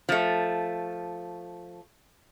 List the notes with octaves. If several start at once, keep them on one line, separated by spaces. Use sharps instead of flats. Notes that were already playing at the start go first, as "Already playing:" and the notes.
F3 A3